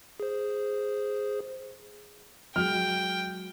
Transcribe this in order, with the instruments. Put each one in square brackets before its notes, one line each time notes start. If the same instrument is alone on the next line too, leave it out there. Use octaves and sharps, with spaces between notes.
[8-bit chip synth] G#4 C5
[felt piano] F#3 G#3 [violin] G5 [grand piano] F6